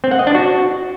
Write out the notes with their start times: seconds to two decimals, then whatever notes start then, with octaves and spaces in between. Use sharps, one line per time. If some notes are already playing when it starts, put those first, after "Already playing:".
0.04 C4
0.11 F#5
0.19 D#5
0.27 D4
0.35 F#4